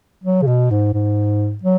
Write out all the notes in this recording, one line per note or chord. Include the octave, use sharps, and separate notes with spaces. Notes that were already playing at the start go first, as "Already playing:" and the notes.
F#3
C#3
B2
G#2
G#2
F#3